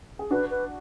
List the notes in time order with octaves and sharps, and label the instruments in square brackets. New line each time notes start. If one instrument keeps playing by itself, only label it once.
[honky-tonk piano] G#4
[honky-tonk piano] D4 F#4 [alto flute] B4
[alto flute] B4